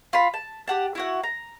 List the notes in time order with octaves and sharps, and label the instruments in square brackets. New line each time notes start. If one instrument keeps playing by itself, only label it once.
[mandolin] F4 B5
A5
G4 F#5 A5
E4 F#4 F#5
A#5